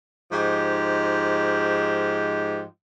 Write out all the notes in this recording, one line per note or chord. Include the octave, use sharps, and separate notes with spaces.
G#2 F3 G4 D#5